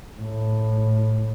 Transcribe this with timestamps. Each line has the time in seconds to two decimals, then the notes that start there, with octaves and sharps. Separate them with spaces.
0.21 A2